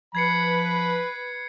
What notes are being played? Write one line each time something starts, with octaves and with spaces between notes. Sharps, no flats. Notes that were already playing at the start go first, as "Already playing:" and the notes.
F3 B4 B5 G#6 C7 C#7